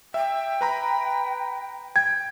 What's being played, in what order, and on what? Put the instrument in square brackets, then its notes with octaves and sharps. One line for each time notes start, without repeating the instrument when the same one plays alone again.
[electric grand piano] E5 [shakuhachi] G5
[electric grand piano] B4 A#5 B5
[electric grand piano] G5 [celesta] G#6